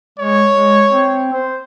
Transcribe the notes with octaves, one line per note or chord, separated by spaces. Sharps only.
G#3 C#5
G#3
C4
C5